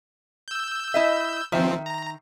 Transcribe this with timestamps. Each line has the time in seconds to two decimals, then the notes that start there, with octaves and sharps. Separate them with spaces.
0.48 E6 G6
0.94 E4 D#5 E5
1.52 D#3 F3 C4 E5
1.86 A#5